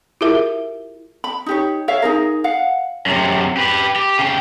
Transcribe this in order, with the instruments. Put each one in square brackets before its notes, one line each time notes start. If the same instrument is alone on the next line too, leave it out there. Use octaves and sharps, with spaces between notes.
[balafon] E4 F4 G4 G#4 A#4 E5
[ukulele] B5
D#4 G4 C#5
C#5 E5 F5
D#4 G#4 A#4
F5 F#5
[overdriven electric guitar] F#2 C3
G4 B4
G4
C#3 G5